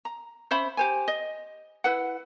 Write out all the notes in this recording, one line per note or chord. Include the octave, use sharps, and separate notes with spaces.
A#5
C#4 C5 E5 B5
G4 C5 G#5
D#5
E4 B4 F#5